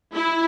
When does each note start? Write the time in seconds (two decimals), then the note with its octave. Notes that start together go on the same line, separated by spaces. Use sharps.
0.14 E4